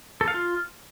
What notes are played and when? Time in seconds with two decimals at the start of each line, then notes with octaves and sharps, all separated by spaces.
0.21 A4
0.28 F5
0.34 F4